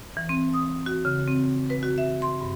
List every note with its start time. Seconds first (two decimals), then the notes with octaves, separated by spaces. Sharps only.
0.17 E3
0.29 C4
0.54 D#6
0.86 F#4
1.05 C#3
1.28 C4
1.70 B4
1.83 F#4
1.98 E5
2.22 C6
2.41 G2